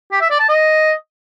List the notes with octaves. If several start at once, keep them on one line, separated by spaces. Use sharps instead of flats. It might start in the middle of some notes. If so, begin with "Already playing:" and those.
G4
E5
D5
A5
D#5